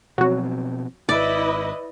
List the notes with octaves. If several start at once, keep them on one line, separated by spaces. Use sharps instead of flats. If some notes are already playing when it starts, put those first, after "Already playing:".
B2 F3 F#3 C4 F#4
G#1 E4 B4 D5 D#5